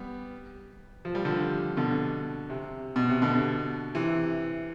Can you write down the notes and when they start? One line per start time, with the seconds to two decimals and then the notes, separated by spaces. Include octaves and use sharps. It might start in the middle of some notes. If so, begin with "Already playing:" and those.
Already playing: G3 B3
1.05 F3
1.15 G3
1.25 D3 F3
1.77 B2 D3
2.50 C3
2.96 B2
3.09 C3
3.22 B2 D3
3.95 C3 E3